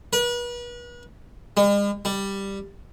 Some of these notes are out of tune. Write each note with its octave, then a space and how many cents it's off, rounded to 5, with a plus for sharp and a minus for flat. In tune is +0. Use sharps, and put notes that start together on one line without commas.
B4 -40
G#3 -45
G3 +5